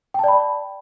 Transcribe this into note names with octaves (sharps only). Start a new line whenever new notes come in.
D5 G5 A5 B5